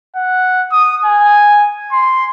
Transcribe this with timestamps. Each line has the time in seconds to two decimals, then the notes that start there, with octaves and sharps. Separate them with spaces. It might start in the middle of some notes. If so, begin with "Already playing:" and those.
0.16 F#5
0.72 D#6
1.05 G#5
1.93 C6